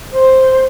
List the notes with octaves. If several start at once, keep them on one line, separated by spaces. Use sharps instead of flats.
C5